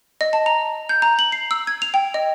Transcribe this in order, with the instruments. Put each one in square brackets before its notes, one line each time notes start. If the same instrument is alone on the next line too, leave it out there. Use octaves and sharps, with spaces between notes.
[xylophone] D#5
A5
A#5
G6
A#5
F#7
C7
E6
G#6
F7
G5
D#5